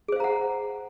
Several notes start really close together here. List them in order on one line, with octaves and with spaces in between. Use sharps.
G#4 C5 F5 A#5 F#5